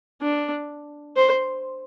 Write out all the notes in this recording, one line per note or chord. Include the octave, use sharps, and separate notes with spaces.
D4
C5